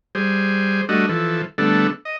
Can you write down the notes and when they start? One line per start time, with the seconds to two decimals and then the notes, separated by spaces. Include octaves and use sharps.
0.15 G3 G#4 C5
0.89 G3 A3 D4 F#4 D#5
1.09 E3 F3 A4
1.58 D3 G3 A3 B3 D4 A4
2.05 D#5